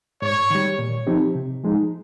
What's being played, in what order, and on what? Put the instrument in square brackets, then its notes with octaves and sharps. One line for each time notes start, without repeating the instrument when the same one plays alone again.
[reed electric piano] G#2 [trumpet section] C#5
[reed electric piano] D#3 G3
A#2
F3 C4 D#4 G4
C3
F3 G#3 D#4